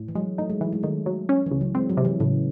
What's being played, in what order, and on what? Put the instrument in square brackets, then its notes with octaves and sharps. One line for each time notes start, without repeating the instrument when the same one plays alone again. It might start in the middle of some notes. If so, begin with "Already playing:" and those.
Already playing: [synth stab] A2
[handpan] E3
[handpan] F#3 [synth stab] G#3
[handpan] A3 [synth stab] D#4
[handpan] G#3
[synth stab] E3 [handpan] F#3
[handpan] G#3
[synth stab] D#3 [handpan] A3
[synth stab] F#3
C#4
[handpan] E3
[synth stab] C#2
[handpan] F#3
[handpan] G#3 [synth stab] C4
[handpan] F#3
[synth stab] C3
[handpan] E3
[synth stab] A2 [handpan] C#3